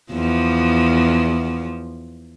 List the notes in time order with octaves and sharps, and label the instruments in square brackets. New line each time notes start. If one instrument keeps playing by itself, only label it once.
[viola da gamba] E2 F3